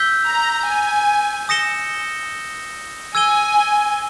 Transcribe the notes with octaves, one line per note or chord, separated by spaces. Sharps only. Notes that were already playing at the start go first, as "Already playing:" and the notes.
Already playing: E6 G6 B6 G7
A#5
G#5
D#6 A#6 C#7 E7 G7
G#5 E6 G#6 D#7 G7